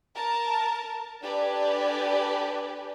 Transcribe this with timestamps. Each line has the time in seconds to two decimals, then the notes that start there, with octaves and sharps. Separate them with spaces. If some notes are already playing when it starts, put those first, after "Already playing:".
0.14 A#4 A5
1.21 D4 G4 A4 B4 D5 G#5